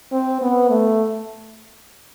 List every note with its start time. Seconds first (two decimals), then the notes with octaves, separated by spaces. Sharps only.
0.12 C4
0.41 B3
0.69 A3